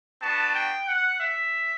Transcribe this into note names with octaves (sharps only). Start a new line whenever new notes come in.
B3 D4 F#4 A5
G5
F#5
E5